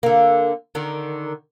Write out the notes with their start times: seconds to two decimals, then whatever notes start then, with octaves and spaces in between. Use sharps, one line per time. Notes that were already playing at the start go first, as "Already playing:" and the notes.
0.03 D3 A#3
0.75 D3 D#3